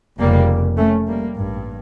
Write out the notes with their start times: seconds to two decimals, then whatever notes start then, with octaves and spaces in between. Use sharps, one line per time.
0.19 F1 F2 C#3 G3 A#3
0.77 A3 C#4
1.06 G3 A#3
1.35 A1 G2